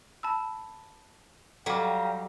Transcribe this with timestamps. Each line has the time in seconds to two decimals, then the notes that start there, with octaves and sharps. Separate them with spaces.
0.23 A5 B5 E6
1.66 F#3 G3 A4 F5 G5 A#5 D6